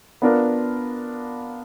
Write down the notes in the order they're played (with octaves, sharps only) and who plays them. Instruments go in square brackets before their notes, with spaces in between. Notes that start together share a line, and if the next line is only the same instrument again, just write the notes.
[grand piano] B3 D4 F4 A#4